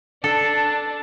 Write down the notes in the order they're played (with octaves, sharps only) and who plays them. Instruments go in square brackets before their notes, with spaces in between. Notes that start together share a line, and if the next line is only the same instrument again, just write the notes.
[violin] D4 A5 [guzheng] A4